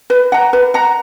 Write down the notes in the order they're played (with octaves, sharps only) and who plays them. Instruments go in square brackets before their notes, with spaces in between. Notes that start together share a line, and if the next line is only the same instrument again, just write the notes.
[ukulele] B4
F#5 A#5
B4
F#5 A#5